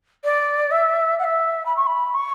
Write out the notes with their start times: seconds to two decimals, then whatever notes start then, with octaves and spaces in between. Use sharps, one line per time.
0.24 D5
0.71 E5
1.19 F#5
1.24 E5
1.66 B5
1.76 C#6
1.87 B5
2.14 C#6